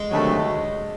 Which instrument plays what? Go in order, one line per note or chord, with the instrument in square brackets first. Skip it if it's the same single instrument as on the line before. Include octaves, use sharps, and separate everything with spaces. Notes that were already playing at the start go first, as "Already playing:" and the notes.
Already playing: [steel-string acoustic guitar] G#3
[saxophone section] D2 C3 D#3 F#3 A3